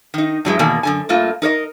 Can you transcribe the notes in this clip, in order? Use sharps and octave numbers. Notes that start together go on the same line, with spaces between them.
D#3 D#4
G2 F#3 G#3 E4
E2 B2 D#3 A#3 A4 G#5
F#2 D3 G#5
G2 A3 A#3 F4
D#4 A#4 C#5 D#5